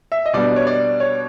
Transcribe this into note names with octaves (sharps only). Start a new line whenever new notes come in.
E5
D#5
B2 G3 B3 D4 D5
C#5
D5
C#5